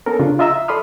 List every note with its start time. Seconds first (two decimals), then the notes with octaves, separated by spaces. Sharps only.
0.06 B3 C#4 A4 A#4
0.19 C#3 D4 F4
0.39 F4 D#5 E5 A#5 E6
0.54 E5
0.68 A4 D5 B5 C6 D#6 F6